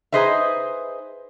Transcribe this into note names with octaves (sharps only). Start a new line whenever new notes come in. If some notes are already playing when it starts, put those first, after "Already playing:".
D#4 G#4 B4 C5 D#5 E5